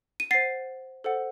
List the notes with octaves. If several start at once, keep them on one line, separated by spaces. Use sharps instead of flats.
D#7
C5 F#5 A6 C7
A4 C5 F#5